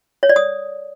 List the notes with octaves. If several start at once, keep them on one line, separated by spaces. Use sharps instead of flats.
C#5
D5
D#6